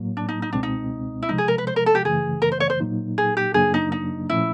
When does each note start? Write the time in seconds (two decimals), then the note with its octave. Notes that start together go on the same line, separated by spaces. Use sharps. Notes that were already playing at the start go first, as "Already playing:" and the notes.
Already playing: A2 F#3 A#3
0.17 D4
0.29 D#4
0.42 D#4
0.53 C#2 B2 G#3 C4 D4
0.63 D#4
1.22 E4
1.29 C3 F3 G#3 D#4
1.38 G#4
1.48 A#4
1.58 B4
1.67 C5
1.76 A#4
1.86 A4
1.95 G4
2.05 F#2 C#3 E3 A3 G#4
2.42 A#4
2.52 C5
2.60 C#5
2.70 C5
2.80 A#2 F#3 A#3 D#4
3.18 G#4
3.37 G4
3.54 F#2 C#3 F#3 A#3 D4 G#4
3.74 D#4
3.92 D#4
4.29 A#2 F3 A3 C#4 E4